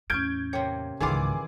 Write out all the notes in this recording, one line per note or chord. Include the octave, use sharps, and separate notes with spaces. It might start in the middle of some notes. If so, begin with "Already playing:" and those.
E2 A2 C#4 F6 G6 G#6 D7
C3 A#3 C#5 G5
C#2 G#2 D#3 E3 F4 G#4 D6